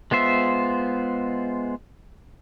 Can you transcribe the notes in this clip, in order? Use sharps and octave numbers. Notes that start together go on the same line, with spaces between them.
G#3 B3 F4 C5 E5